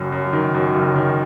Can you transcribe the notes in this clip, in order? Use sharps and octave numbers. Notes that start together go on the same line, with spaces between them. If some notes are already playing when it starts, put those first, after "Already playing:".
Already playing: F#1 F#2
F#2
D#3
F#2
F#1
D#3